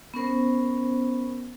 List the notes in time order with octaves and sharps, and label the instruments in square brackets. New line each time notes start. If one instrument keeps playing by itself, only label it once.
[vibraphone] B3 C#4 A#4 C5